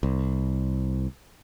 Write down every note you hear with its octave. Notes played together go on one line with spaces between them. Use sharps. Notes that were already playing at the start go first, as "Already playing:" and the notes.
C2